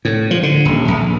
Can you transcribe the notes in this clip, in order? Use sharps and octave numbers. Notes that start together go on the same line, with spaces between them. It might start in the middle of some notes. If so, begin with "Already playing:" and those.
A2
F3
D3
D#1
A#1